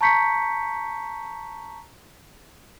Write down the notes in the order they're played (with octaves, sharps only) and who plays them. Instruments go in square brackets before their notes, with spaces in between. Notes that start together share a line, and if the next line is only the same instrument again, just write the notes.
[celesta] A5 A#5 C#6 G6 B6 C#7